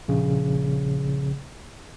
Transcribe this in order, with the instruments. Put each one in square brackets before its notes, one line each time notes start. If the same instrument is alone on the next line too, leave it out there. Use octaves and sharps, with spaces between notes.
[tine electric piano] A#1 C#3